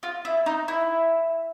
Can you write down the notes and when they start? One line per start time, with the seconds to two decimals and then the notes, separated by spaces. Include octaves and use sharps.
0.03 F4
0.25 E4
0.46 D#4
0.68 E4